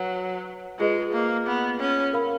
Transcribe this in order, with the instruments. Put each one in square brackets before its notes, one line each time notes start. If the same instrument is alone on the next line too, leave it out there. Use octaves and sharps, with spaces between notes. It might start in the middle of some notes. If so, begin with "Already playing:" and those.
Already playing: [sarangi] F#3 [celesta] B4
[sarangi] G#3 [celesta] F4 G#4 B4 D#5
[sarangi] A#3
B3
C#4
[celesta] A#4 F5 B5